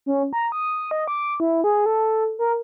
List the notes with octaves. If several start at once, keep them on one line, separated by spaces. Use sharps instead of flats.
C#4
A#5
D#6
D#5
D6
E4
G#4
A4
A#4